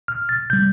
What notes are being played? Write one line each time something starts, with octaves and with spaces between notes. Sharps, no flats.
F6
A6
C3 G3 G6